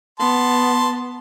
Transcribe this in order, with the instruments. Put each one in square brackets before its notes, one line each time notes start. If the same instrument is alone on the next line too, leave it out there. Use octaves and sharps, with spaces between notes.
[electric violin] B3 [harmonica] A5 C6